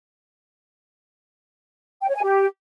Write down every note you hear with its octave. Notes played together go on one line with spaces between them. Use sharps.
G5
C#5
G#5
G4